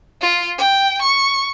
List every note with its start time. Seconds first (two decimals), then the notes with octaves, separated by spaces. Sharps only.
0.22 F4
0.58 G5
1.02 C#6